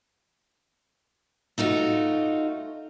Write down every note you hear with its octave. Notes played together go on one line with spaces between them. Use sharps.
A3 D#4 F4 F#4